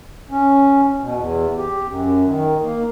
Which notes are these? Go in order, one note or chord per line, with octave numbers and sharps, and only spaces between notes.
C#4
B2
E2
G4
F#2
D#3
A#3